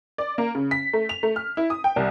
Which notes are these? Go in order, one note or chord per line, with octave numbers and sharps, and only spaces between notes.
D5
A#3
C#3
B6
A3
F7
A3
F6
E4
D#6
G5
C2